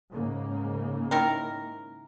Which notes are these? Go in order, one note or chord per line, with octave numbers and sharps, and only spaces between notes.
G#2 C#3 A#3
D#3 E4 A#4